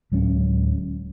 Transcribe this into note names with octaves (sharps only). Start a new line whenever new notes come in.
D1 F#3 G#3 C#4